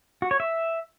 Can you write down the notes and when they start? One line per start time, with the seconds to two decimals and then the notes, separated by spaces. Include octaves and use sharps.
0.22 F#4
0.31 C#5
0.40 E5